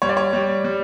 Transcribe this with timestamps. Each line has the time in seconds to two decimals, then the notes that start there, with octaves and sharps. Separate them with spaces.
0.02 G3 C#5
0.09 D5
0.17 C#5
0.33 G3
0.64 G3